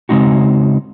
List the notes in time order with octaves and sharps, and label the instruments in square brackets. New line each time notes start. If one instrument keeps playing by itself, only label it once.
[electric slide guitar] C#3 G#3 C4 D#4 F#4